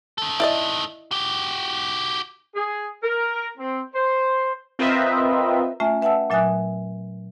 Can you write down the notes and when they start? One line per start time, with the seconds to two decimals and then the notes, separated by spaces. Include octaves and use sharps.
0.18 D#3 A4
0.40 E4 D5 D#5
1.11 F#4 G4
2.55 G#4
3.03 A#4
3.58 C4
3.94 C5
4.79 C4 F4 A#4 B4 D#5 E5
5.80 A3 C#4 F4 E5 G#5
6.02 B4 E5 F#5 G5 A5 E6
6.30 A#2 F#3 E5 G#5 D#6 F#6